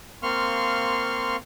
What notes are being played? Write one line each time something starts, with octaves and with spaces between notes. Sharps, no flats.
A#3 C4 F5 C6 C#6 F6